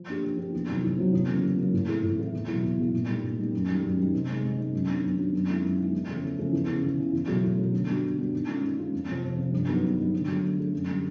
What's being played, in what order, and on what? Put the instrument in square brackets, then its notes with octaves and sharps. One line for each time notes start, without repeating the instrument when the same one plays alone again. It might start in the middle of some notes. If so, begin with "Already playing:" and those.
Already playing: [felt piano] F3
A#3 D4 G4
F3
A#3 D4 G4
E2
C3 D#3 F#3
E2
C3 D#3 F#3
E2
C#3 F#3 A#3
E2
C#3 F#3 A#3
A2
E3 A3 C4 E4
A2
E3 A3 C4 E4
E2
B2 F#3 B3 E4
E2
B2 F#3 B3 E4
A#2
G3 A#3 D#4
A#2
G3 A#3 D#4
F#2
D#3 G3
F#2
D#3 G3
C3
D#3 G#3
C3
D#3 G#3
F#2
D#3 F#3 B3 D4
F#2
D#3 F#3 B3 D4
F#2
D#3 G#3 B3 E4
F#2
D#3 G#3 B3 E4
E2
C#3 F3 A3 C#4
E2
C#3 F3 A3 C#4
E2
C#3 E3
E2
C#3 E3
E2
B2 F#3 A3
E2
B2 F#3 A3
D3
G3 B3 D4 F#4
D3
G3 B3 D4 F#4
D#3
G#3 C#4 F4
D#3
G#3 C#4 F4
F2
C3 F3
F2
C3 F3
G2
D#3 F#3 B3 D#4
G2
D#3 F#3 B3 D#4
D3
F#3 A3
D3
F#3 A3
F#2
D3 G3